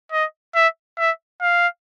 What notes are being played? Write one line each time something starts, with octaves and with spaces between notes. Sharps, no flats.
D#5
E5
E5
F5